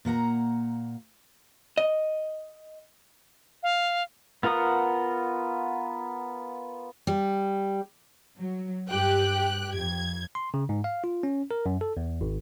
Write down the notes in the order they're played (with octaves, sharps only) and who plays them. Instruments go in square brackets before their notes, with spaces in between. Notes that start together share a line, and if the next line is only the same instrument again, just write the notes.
[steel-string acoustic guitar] A#2 A#3 F#5 A#5
[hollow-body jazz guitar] D#5
[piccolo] F5
[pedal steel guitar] B3 F4 A#4 F#5 D#6
[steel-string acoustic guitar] G3
[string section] F#3
G2 G4 G5 F#6
F2 G#6
[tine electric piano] C6
C#3
G#2
F5
F4
C#4
A#4
F#2
A4
E2
G#1